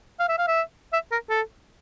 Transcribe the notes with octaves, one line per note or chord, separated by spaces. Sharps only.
F5
E5
F5
E5
E5
A#4
A4